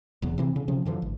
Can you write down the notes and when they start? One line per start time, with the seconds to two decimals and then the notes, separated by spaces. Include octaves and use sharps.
0.22 E1 E2 B3
0.38 C3 E3 C4
0.56 C#3
0.68 C3 F3 C#4
0.85 F#2 D3 E3 F3
1.02 G#1